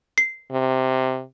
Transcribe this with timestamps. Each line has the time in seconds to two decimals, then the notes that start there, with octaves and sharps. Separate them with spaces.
0.18 C7
0.51 C3